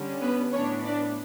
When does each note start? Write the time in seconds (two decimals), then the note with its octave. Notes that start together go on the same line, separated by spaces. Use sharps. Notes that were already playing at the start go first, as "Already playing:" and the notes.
Already playing: D3 G3 C#4
0.22 B3 B4
0.53 A2 E3 B3 C#4 D4 C#5
0.85 D4 D5